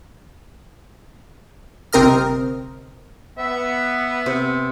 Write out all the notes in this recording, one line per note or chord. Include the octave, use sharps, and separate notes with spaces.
G1 C3 C4 A#4 D#5 F6
B3 E5
C3 C5